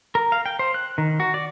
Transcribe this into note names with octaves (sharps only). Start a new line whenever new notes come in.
A#4
F5
G5
C5
F#6
D#3
F#4
D5